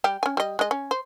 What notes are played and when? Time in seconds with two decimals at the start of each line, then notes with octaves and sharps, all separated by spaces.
0.04 G3 G4
0.23 C#4 G#5
0.37 G3 D#5
0.59 G#3 D#5
0.71 C#4
0.91 C5